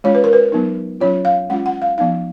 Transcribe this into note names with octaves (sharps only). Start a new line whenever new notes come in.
G#3 C#4 F4 C#5
B4
A#4
B4
F#3 B3 D#4
F#3 C#4 F4 C#5
F5
G#3 C#4 F4 F#5
F#5
F5
F3 B3 D#4 F5